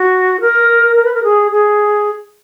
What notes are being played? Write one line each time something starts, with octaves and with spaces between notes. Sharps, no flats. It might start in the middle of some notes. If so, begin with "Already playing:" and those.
Already playing: F#4
A#4
A#4
B4
A#4
G#4
G#4